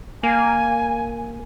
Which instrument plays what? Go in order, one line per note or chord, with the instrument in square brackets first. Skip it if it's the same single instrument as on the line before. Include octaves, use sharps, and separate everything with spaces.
[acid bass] A#3 [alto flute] G#5